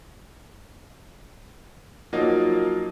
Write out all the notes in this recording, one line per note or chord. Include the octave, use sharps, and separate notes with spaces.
F3 F#3 A#3 D#4 F4